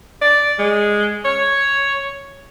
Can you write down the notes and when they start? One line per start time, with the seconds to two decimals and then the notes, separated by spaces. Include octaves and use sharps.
0.22 D5
0.59 G#3
1.25 C#5